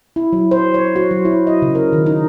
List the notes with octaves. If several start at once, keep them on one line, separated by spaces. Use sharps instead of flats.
E4
F#3
C5
C#5
F#4
F#3
E4
D#5
C#3
A#4
D#3
D#4